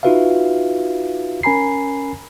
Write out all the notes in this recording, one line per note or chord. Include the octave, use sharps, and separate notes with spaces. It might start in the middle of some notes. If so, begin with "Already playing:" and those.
D#4 F4 F#4 B4 E5 F5
C#4 A#4 G#5 A#5 B5 C7